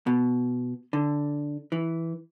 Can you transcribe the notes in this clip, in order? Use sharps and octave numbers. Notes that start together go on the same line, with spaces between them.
B2
D3
E3